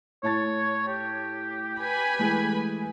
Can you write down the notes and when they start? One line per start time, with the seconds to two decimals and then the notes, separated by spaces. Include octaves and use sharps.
0.23 A2 C#5 A5 A6
0.87 G4
1.80 B4 G#5 B5
2.19 E3 G#3 A3